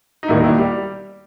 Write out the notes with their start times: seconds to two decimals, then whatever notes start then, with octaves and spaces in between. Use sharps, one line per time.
0.23 D#4
0.28 E1 D#2 D#3 G3 E4
0.44 E4
0.58 G3 G4